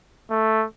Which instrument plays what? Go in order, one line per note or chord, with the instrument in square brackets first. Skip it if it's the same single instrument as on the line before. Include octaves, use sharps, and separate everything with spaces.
[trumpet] A3